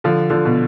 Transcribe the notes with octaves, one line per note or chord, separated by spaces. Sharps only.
D3 F3
D3 F3
B2